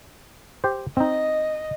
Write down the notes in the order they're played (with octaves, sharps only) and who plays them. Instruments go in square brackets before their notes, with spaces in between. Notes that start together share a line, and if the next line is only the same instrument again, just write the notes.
[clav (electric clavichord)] G4 C5
[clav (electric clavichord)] C4 D#4 [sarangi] D#5